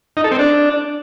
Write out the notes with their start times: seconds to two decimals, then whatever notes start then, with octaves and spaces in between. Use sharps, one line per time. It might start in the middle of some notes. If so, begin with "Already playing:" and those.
0.17 D#4
0.24 A4
0.32 C4
0.39 D4